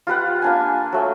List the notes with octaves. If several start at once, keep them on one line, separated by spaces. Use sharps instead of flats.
F4 G4 B4 F#5
A#3 D4 G#5
F#3 A3 G#5